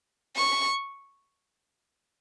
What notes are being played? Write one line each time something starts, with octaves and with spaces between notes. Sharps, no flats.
C#6